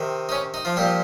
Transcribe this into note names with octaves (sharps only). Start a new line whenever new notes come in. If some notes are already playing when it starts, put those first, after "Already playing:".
Already playing: C3 D#3
D#4
C#4
D#4
F3 F4
A#2 F3 G3 G4